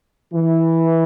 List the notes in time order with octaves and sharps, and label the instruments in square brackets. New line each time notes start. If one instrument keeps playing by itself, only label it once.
[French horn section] E3